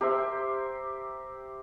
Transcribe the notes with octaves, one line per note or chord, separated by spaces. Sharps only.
G4 A#4 C5 E5